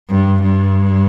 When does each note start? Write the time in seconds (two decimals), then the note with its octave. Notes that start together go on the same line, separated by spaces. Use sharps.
0.10 G2
0.43 G2